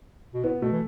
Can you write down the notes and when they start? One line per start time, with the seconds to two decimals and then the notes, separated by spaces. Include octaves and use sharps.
0.34 B2
0.44 A2 B3
0.62 B2 A3
0.72 E3